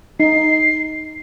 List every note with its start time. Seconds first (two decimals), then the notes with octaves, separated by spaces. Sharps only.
0.20 D#4 C7